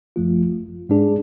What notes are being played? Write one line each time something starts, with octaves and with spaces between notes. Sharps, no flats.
G#1 F#2 F3 A3 F4
G#2 G#3 D4 G#4